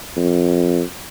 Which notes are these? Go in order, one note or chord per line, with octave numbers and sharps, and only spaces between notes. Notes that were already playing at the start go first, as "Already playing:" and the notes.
F2